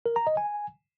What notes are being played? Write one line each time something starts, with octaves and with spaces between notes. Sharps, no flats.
A#4
A#5
D#5
G#5